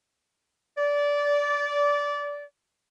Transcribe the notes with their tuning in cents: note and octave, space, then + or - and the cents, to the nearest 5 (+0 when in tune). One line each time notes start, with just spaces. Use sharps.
D5 -20